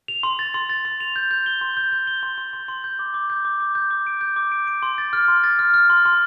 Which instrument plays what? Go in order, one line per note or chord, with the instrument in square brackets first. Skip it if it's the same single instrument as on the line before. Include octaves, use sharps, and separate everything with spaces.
[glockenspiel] F7
C6
A6
C6
A6
C6
F7
G6
G6
G7
C6
G6
G6
G7
C6
C6
C6
C6
G6
D6
D6
G6
D6
D6
G6
D6
D7
G6
D6
D7
D7
C6
A6
F6
C6
A6
F6
F6
C6
C6